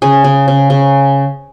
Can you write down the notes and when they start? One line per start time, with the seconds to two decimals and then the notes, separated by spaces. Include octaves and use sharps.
0.02 C#3 G#4
0.24 C#3
0.48 C#3
0.70 C#3